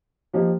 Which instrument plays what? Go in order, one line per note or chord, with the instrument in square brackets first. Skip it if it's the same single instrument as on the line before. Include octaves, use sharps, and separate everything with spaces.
[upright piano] F3 A#3 D#4 G4